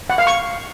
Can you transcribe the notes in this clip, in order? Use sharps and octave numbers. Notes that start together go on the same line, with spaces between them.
F#5
F5
C#6